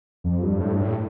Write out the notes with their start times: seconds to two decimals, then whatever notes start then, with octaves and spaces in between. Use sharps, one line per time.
0.24 F2
0.42 G2
0.61 A2
0.71 G2
0.82 A2